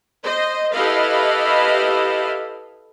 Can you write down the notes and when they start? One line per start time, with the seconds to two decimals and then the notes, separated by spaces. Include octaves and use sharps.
0.24 C5 D#5
0.74 E4 G4 A4 B4 D#5 F5